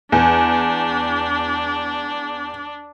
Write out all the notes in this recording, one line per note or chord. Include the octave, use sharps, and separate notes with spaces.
E2 D4